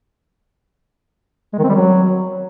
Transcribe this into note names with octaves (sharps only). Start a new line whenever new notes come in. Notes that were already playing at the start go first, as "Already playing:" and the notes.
G#3
D#3
C4
G3
F#3